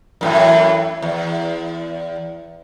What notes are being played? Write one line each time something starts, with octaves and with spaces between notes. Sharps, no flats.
F#2 A2 E3
E2